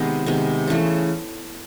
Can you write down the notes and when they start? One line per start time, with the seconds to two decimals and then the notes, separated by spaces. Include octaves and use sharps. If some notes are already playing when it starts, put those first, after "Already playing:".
Already playing: C3 D#3 G#3 B3
0.26 C3 D#3 G#3 B3
0.67 C#3 E3 A3